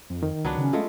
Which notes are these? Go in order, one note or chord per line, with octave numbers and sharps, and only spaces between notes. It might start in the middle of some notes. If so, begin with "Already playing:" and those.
F2
D#3
C#2 F#3 B3 D4
C#3 C#4
G#3 A3 F4